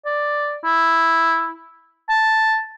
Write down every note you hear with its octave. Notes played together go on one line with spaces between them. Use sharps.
D5
E4
A5